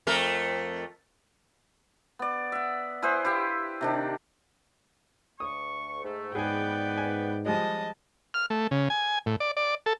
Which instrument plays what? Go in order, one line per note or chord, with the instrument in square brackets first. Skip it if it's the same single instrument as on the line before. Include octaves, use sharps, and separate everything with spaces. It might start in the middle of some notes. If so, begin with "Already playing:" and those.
[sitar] F2 A3 A#4
[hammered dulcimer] B3 D5
E5 F#5
E4 G#4 B4 C5
E4 G4 E5 F5
C3 D#3 D4
[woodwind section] D2 C#6 [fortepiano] D#6
[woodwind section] G#2 A3
[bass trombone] G#2 [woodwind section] B3 B4 [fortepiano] G#4 G#5 [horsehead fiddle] D5 G5
[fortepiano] G#5
[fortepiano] F3 G3 G#3 [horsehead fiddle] D#5 A5
[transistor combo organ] F6
A3
C#3
G#5
A2
D5
D5
A4